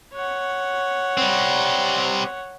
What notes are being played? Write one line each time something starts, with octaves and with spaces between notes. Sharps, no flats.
C#5 F#5
G3 C4